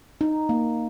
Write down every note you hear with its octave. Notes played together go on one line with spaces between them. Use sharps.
D#4
A#3